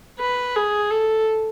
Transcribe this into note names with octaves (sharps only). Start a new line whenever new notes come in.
B4
G#4
A4